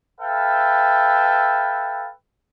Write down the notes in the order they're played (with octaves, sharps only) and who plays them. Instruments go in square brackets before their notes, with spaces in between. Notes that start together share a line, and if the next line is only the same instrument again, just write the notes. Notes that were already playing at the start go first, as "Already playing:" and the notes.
[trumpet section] A4 B4 E5 F5 G5